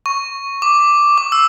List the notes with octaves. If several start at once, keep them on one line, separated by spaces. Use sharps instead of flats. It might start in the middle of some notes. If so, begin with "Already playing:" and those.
C#6
D6
D6
E6